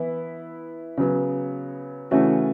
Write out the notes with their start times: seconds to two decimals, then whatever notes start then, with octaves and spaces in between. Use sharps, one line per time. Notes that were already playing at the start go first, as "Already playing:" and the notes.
Already playing: E3 B3 E4
0.97 C#3 F#3 B3
2.11 C#3 E3 A3 C#4 F#4